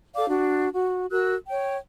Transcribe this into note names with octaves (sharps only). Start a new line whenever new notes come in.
A4 D5 F5 D6
D4 F#4
F#4
F#4 A#4 E6 F#6
C#5 G5